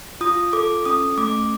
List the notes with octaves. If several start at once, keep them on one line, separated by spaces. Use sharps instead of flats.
F4 D#6
A4 D6
C#4 D#6
A3 D6